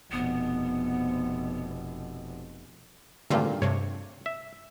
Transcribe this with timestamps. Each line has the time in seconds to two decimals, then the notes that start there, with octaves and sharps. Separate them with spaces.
0.12 F1 B2 B3
3.30 G#1 G2 A#2 D3 A3 F4
3.62 G2 C3 C#5
4.26 E5